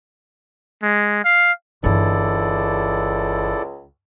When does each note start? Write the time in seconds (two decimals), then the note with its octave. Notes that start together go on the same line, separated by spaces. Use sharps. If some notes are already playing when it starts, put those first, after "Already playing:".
0.83 G#3
1.25 F5
1.84 G1 C#2 E3 E4 A4 D5